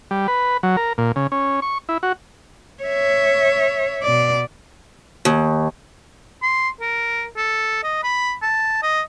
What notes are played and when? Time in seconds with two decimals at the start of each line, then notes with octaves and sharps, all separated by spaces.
0.11 G3
0.28 B4
0.63 F#3
0.77 A#4
0.98 A#2
1.16 C#3
1.32 C#4
1.62 C#6
1.89 E4
2.03 F#4
2.84 C#5 E5
4.03 B2 D5
5.25 D#2
6.43 C6
6.81 A#4
7.37 A4
7.83 D#5
8.04 B5
8.43 A5
8.83 D#5